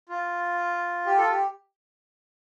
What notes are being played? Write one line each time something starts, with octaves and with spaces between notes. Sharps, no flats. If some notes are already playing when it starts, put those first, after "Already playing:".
F4
G4
F4 A4
G4